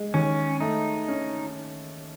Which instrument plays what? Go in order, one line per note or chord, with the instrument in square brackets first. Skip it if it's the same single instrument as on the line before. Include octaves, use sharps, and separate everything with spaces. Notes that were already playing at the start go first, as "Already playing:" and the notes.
Already playing: [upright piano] G#3
[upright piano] D#2 [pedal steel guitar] C#4
[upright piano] A3 [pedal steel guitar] D#4
[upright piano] C#4